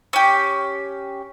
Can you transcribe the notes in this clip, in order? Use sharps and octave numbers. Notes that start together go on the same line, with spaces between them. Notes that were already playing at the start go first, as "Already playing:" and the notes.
C#4 G4